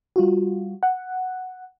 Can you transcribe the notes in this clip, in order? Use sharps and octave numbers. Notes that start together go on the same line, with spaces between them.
G3 F4 F#4
F#5